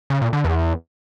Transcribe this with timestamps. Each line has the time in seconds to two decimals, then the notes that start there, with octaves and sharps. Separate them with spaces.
0.10 C#3
0.22 A#2
0.33 D3
0.44 E2